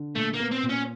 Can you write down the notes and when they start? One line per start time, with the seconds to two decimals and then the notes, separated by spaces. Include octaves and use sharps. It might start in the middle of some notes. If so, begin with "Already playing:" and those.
Already playing: D3
0.15 A#2 A3
0.33 A#3
0.40 B3
0.51 C4
0.63 A#2
0.69 C#4